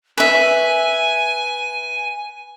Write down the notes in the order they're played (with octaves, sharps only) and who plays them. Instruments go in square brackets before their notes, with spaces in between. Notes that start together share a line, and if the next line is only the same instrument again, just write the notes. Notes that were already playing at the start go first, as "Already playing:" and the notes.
[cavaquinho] B4 E5 [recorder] G#5